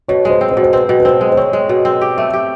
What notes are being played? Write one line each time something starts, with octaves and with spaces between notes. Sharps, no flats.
B2 C#5
G#3 C5
C4
C5
B2
C5
C4 B4
B2
B4
C4 C5
G#3
C5
C4 C#5
G#3
B2
C4
G4
A3
G4